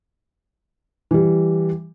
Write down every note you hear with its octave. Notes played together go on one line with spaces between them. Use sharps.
E3 G3